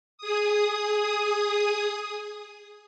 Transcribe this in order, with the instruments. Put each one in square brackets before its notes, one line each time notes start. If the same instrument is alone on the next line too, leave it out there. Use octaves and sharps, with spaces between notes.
[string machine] G#4 D#6